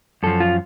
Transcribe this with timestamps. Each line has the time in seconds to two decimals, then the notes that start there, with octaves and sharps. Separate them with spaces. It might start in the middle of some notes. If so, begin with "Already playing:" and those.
0.23 F#2 F3 A4
0.40 F4